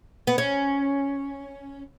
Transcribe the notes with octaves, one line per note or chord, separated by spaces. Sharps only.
B3
C#4